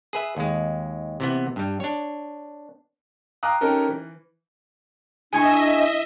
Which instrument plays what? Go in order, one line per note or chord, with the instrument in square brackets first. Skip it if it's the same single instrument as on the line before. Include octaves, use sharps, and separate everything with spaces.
[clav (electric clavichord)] G#4 B4 E5
D#2 G#3
C3 E3 B3
G2 G3
D4 C#5
[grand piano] F5 G5 A#5 D6 D#6 F#6
C#4 D#4 G4 A4 A#4
E3
[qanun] E3 E4 [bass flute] D4 [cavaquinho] G#4 G#5 C#6 [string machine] D#5 E5